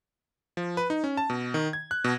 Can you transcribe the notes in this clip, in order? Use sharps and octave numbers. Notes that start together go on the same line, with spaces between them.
F3
B4
D#4
C#4
A5
B2
D#3
G#6
F#6
B2